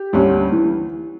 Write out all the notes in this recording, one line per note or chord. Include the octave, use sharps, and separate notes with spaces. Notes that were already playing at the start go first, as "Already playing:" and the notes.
Already playing: G4
D2 D3 G3 C#4
E3